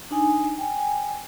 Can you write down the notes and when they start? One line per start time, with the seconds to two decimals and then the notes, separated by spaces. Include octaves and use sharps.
0.11 D4 D#4 G#5
0.58 G5 G#5